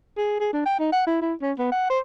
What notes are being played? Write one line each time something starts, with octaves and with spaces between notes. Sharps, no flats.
G#4
G#4
D4
G5
D#4
F#5
E4
E4
C#4
B3
F#5
C5